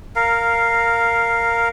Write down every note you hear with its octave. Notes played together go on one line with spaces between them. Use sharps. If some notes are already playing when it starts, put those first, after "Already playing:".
A#4 F5